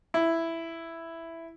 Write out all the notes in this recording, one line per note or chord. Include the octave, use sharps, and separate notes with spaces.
E4